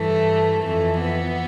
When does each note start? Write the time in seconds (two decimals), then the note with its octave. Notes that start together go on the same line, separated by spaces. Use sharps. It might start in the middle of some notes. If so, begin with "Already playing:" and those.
Already playing: G2 E3 A3
0.62 F2 E3 A3
0.99 B3